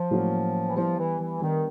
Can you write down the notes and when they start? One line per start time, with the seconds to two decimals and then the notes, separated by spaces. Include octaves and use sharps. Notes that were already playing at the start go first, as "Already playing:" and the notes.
Already playing: F3
0.11 A2 F#3 A#3 C#4 F#4
0.67 E3
0.76 F3 G3 B3 E4
0.98 E3
1.19 E3
1.41 D#3 G3 B3 D4